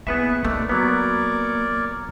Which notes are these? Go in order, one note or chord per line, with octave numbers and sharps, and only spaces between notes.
A#3 B3 E4 G#4 B4 E5 C#6
A3 A#3 D#4 B4 D5
F#3 B3 A#4 C#5 D5